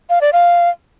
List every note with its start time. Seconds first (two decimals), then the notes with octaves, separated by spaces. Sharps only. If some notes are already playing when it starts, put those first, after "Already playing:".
0.10 F5
0.21 D5
0.33 F5